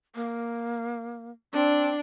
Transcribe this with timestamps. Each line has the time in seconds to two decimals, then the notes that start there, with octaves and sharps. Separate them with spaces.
0.15 A#3
1.53 C4 D4